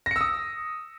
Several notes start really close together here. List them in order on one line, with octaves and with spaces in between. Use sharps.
A#6 C#7 E6 D#6